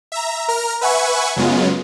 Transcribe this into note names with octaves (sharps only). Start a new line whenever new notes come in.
E5 A#5
A#4 A#5 F6
B4 E5 F#5 G#5 C#6
F#2 C#3 F#3 G#3 B3 F4